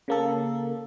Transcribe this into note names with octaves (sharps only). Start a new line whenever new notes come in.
C#3 A#3 A4